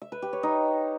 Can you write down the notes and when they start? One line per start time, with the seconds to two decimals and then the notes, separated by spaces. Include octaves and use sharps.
0.02 E5
0.12 B4
0.22 G4
0.33 C#5
0.43 D#4